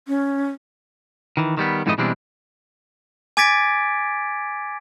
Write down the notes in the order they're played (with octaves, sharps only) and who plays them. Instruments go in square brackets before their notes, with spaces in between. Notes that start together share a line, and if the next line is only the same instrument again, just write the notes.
[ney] C#4
[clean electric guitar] D#3 E3
D#3 G3 B3
F2 G#2 E3 G3 A3 D#5
B2 E3 G3 G#3 C4 D4
[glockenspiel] G#5 D6 G#6 A6 B6 D7